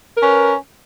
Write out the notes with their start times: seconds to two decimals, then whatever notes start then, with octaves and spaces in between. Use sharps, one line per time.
0.17 A#4
0.19 C#4
0.22 B4